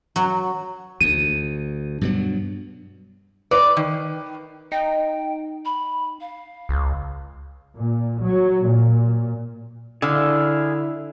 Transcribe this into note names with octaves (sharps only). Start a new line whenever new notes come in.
F#3
D2 D#7
G2 B2 F#3
B4 D5
D#3
D#4 G5
B5
F5
C#2
A#2
F#3
A#2
D3 E4 G#4 E5 F5